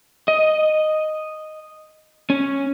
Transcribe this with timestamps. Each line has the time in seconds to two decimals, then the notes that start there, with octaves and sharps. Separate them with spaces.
0.28 D#5
2.30 C#4